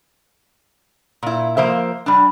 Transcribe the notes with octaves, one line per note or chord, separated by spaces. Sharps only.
A#2 E4
F3 A#3 C5 E5
G3 D4